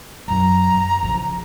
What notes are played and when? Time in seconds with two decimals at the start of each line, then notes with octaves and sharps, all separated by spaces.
0.28 F#2 F#3 A#5
0.74 F#2
1.03 C#3 F3